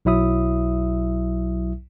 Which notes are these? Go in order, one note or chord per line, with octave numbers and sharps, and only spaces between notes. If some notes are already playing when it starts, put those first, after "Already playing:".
B1 F#3 E4 E5 D#6